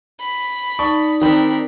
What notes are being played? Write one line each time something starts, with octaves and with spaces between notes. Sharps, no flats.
B5
D#4 D5 A5 C#6
D#3 C4 D4 A#4 B5